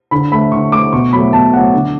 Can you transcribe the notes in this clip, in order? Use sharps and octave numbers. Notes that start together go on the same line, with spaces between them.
D3 B5
A3 B5
D3 C#6
A3 D6
B2 C#6
F#3 A3 B5
B2 A5
F#3 A3 F#5
D3